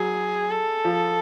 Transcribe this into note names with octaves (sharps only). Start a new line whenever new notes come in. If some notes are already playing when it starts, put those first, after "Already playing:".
Already playing: F#3 G#4
A4
F3